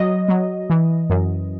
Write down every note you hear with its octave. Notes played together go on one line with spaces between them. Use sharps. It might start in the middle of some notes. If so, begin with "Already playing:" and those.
Already playing: F#3 D#5
F#3
E3
F#2